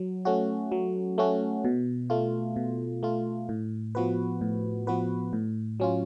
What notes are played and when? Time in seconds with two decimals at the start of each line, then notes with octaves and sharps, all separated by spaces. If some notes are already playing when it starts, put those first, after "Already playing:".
Already playing: F#3
0.25 A3 C#4 F#4
0.72 F#3
1.18 A3 C#4 F#4
1.65 B2
2.10 A3 F4
2.56 B2
3.03 A3 F4
3.49 A2
3.95 F3 B3 F#4 B4
4.41 A2
4.87 F3 B3 F#4 B4
5.33 A2
5.80 F#3 C#4 F4